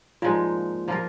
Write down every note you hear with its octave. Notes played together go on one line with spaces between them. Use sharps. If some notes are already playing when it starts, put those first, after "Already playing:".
A#2 F3 G#3 D#4 F4
F3 A#3 F4 A#4